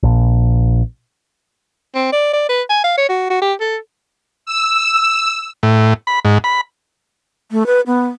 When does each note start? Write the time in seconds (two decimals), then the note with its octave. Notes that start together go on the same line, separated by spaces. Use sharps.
0.03 A#1
1.95 C4
2.12 D5
2.33 D5
2.49 B4
2.70 G#5
2.84 F5
2.97 C#5
3.09 F#4
3.30 F#4
3.42 G4
3.60 A4
4.46 E6
5.63 A2
6.07 B5
6.25 G#2
6.44 B5
7.52 A3
7.66 B4
7.87 B3